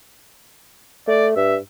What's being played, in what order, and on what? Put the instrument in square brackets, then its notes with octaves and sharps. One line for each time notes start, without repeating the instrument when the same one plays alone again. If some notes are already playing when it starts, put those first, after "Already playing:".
[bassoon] A3 [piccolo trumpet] D5
[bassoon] G2 [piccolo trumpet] E5